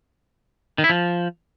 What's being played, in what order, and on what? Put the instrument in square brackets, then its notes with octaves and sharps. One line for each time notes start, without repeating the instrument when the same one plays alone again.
[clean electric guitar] D#3
E4
F3